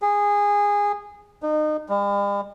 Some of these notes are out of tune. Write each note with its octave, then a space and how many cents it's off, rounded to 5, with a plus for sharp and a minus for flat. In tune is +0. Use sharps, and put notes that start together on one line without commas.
G#4 -20
D#4 -30
G3 +45